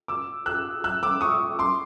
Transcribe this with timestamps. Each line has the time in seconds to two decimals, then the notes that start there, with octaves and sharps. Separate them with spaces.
0.08 D6 E6
0.46 E6 F#6
0.84 E6 F#6
1.03 D6 E6
1.21 C#6 D#6
1.59 C6 D6